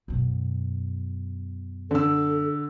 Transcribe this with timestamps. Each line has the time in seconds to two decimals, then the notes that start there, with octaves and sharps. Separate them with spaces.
0.08 F#2 B2
1.91 D3 A4 E6